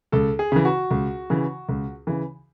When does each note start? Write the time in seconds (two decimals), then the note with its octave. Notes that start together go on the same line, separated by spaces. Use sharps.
0.12 C#2 A4
0.39 G#4
0.52 C#3 E3
0.65 F#4
0.91 C#2
1.30 C#3 E3
1.69 C#2
2.07 C#3 E3